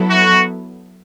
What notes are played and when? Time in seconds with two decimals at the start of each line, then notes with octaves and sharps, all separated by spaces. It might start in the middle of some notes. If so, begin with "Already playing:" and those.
Already playing: F#3 B3 E4 A4
0.09 F#4